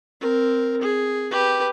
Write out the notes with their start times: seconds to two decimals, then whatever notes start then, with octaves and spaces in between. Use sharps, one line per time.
0.21 C4 A#4
0.82 G#4
1.31 G4 B4